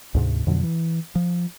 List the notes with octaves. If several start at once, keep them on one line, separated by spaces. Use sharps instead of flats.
D2 G#2 C3
F2 B2 D3 F#3
E3
F3